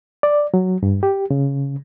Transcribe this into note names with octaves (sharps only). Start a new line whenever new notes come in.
D5
F#3
G2
G4
C#3